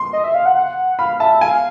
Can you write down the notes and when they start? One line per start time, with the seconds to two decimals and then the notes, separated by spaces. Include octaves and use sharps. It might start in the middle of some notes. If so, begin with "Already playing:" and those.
Already playing: C6
0.13 D#5
0.24 E5
0.35 F5
0.46 F#5
0.56 F#5
0.99 F5 B5
1.20 E5 A5
1.41 F5 G#5